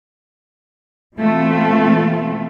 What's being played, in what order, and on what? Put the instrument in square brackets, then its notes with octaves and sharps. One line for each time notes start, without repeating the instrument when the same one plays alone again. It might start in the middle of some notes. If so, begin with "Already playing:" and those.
[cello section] B2 E3 A3 C4 F4